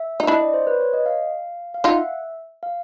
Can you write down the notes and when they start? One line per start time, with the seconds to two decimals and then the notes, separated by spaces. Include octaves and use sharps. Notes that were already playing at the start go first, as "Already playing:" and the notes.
Already playing: E5
0.20 D#4
0.27 D4 E4 D#5
0.41 D5
0.54 C5
0.67 B4
0.80 C#5
0.93 D#5
1.06 F5
1.74 F5
1.84 D#4 F4 F#5
1.97 E5
2.63 F5